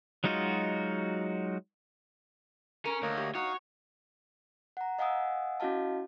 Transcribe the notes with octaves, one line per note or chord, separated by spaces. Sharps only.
F#3 G#3 D#4 F4 F#4
C#4 A#4
D2 A#3 C#5 D#5
G4
D#4 F#4 C#5 F5 D#6
F#5 A#5
D#5 F5 F#5 G#5 D#6 E6
C#4 E4 F#4 D#5 F5 A5